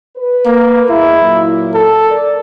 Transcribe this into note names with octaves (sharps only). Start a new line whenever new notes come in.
B4
A#3
E2 G#3 E4
A#2 F#3 A#3
A4
A#4 D5